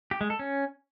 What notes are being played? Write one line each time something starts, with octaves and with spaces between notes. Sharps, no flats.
G4
G#3
A4
C#4